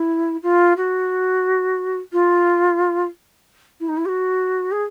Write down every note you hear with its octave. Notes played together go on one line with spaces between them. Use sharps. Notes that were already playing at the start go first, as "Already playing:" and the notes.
Already playing: E4
F4
F#4
F4
E4
D#4
E4
G4
F#4
G#4